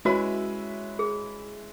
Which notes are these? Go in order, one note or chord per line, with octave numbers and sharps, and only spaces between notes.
G#3 C#4 E4 F#4 B4 E5
G#4